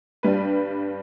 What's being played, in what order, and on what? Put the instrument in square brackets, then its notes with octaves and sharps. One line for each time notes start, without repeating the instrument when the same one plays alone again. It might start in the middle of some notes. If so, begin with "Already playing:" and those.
[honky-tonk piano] G2 G3 D4 B4